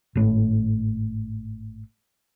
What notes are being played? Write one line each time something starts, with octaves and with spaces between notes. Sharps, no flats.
G#1 A2